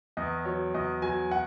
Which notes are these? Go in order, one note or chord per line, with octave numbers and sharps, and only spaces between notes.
E2 D#5
F#3 C#5
E2 D#5
F#3 G#5
F#5